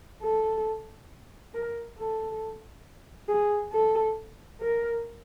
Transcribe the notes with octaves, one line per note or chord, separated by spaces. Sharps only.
A4
A#4
A4
G#4
A4
A#4